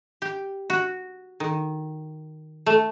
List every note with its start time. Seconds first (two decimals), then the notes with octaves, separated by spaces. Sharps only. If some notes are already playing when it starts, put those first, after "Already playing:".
0.22 G4
0.70 F#4
1.40 D#3
2.66 A3